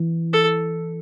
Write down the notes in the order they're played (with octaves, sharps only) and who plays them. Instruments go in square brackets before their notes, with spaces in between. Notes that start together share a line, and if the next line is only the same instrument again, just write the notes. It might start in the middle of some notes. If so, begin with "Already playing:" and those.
Already playing: [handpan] E3
[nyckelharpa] A4